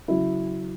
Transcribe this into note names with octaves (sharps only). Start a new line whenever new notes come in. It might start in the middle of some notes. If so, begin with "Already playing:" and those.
C#3 F#3 E4